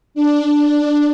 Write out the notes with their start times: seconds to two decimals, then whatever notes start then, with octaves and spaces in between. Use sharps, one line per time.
0.15 D4